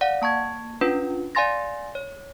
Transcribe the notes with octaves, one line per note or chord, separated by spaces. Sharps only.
D5 F5 F#5
A#3 A5 C#6 G#6
C#4 D4 F4 B4
D5 F5 G#5 C6 A6 A#6
C#5